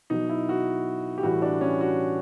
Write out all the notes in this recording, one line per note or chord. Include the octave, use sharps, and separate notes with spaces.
B2 F#3 D#4
E4
F#4
G4
A2 E3 G3 F#4
D4
C#4
F#4